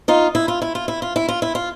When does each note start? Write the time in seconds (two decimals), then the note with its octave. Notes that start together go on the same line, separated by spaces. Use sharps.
0.08 D#4 F4
0.35 E4
0.48 F4
0.62 E4
0.75 F4
0.88 E4
1.02 F4
1.16 E4
1.28 F4
1.42 E4
1.55 F4